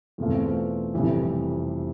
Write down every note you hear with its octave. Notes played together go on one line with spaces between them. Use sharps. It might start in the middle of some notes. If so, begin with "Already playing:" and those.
E2 B2 A3 C4 F4
F1 F2 E3 G3